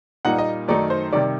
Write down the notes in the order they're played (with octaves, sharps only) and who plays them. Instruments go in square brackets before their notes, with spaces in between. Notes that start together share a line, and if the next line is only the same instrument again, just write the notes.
[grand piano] A#2 G3 A#3 D#4 F#5
D#5
F#2 D#3 A3 D#4 D5
C5
C3 D#3 G3 D5